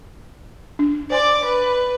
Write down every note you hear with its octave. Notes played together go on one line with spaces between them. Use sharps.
D4
C5 D5 G#5 C6 D6
B4